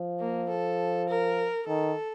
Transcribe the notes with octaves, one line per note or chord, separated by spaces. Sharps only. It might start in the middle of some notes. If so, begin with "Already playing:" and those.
Already playing: F3
A#3
A4
A#4
D#3 A4